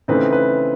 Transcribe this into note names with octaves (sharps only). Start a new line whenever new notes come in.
C#3 E3 A3 C4 D#4 B4
B4